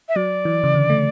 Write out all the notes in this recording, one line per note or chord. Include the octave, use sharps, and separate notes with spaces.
E5
F#3 D5
E3
C#3
D3
A3